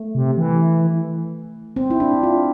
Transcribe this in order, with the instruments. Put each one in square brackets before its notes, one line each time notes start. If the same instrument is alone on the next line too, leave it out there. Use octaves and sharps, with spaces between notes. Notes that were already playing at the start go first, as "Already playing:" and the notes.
Already playing: [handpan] A3
[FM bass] C3
E3
[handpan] C4
E4
D4
F4